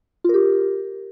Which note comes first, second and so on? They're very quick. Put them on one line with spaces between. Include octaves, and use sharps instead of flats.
F4 A#4 G4